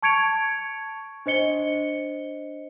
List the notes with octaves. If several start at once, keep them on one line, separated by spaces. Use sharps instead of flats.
A5 C#6 G#6 C#7 D7 F7
D4 C5 D#5 C#7 G7